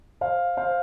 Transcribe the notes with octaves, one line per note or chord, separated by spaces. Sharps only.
C5 F5
C5 F5